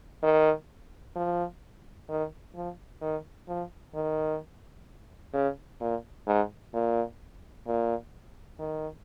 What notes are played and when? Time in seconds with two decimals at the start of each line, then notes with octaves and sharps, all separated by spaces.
0.23 D#3
1.16 F3
2.09 D#3
2.55 F3
3.02 D#3
3.48 F3
3.95 D#3
5.34 C#3
5.81 A#2
6.27 G#2
6.74 A#2
7.67 A#2
8.60 D#3